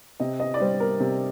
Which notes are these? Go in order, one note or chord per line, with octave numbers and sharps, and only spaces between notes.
C3 D#5
D#5
D5
G3 C5
A#4
C3